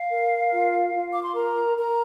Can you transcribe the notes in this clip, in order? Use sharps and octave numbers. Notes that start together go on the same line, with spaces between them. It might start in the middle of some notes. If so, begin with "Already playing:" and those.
Already playing: F5
A#4
F4
F4
D6
C6
A#4 A#5
A#4 A#5